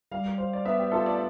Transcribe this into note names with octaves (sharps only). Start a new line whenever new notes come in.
G3 F5
C5
D5
B3 E5
G4
F4 A4
D5